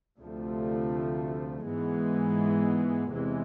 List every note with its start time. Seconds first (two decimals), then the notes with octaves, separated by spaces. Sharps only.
0.18 D2 C3 F3 A3
1.65 G#2 E3 G#3 B3
3.11 E2 C3 E3 G#3